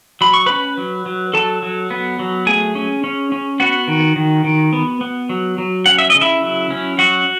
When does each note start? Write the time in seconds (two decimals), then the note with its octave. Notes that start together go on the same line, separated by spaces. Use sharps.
0.21 F#3 B5
0.34 C#6
0.46 C#4 B4 B5
0.78 F#3
1.06 F#3
1.34 F#3 A4 A5
1.62 F#3
1.91 B3
2.19 F#3
2.46 A3 G#4 G#5
2.75 C#4
3.04 C#4
3.32 C#4
3.60 B3 F#4 F#5
3.88 D#3
4.16 D#3
4.44 D#3
4.73 B3
5.01 B3
5.29 F#3
5.58 F#3
5.86 C#4 F#5
5.98 E5
6.10 C#3 D#5
6.21 E4 E5
6.42 F#3
6.70 C#4
6.98 F#3 F#4 F#5